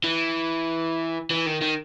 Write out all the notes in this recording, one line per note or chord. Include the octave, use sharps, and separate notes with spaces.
E3
E3
D#3
D#3